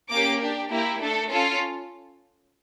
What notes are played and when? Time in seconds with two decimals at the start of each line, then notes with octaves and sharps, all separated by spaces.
0.10 A#3 C#4 G4 D6
0.40 D4 G4
0.70 A#3 E4 G4
1.00 A3 D4 A4
1.30 C#4 F4 A4